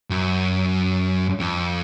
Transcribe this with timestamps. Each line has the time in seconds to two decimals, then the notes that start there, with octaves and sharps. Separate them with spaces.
0.10 F#2
1.40 F2